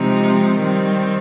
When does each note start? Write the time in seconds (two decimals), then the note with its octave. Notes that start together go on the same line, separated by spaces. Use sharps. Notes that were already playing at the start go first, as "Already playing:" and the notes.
Already playing: C3 F3 G#3 C4 D#4
0.59 D#3 G3 C4